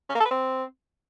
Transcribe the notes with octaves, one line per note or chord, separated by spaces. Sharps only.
C#4
A#3
A4
B4
C4